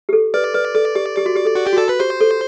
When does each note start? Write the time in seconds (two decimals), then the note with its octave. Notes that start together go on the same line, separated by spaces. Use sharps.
0.09 G4
0.13 A4
0.34 B4 D5
0.55 B4
0.75 A4
0.95 G4
1.17 G4
1.26 F#4
1.35 G4
1.45 A4
1.55 F#4
1.67 G4
1.73 F#4
1.78 A4
1.89 B4
2.00 G4 C5
2.21 A4